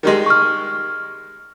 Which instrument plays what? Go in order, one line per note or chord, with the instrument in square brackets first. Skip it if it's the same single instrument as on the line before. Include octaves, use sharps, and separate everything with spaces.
[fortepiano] D#3 G3 G#3
[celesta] C#6 F6